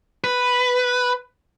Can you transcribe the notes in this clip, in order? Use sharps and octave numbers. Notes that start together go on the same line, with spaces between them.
B4